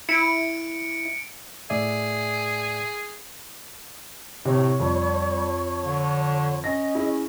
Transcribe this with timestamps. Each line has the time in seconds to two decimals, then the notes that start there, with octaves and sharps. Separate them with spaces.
0.09 E4 C#7 D7
1.70 A2 G#4 D5 E5
4.45 A2 C3 C#5
4.80 F2 G3
5.84 D3
6.64 C#4 D#5 A#6
6.95 E4 G#4